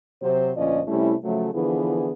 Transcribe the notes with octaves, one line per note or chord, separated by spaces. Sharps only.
C3 F#3 C5
D2 A#2 F3 C#4 D5 D#5
C3 G3 A3 C#4 E4
C#3 F3 F#3 A3
D3 E3 F3 B3 E4 G#4